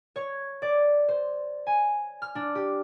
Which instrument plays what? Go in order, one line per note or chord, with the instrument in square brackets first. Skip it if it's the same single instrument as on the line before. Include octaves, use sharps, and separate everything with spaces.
[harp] C#5
D5
C5
G#5
F6
D4
G4